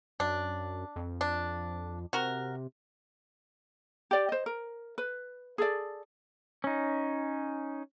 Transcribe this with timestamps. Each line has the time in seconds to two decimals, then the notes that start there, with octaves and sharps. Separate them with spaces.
0.20 F#2 D4
0.96 F2
1.21 D4
2.13 C3 F#4 A#4
4.11 G4 D5 G5
4.29 C5 D#5
4.46 A#4
4.98 B4
5.58 G#4 A4 D5
6.64 C#4 D#4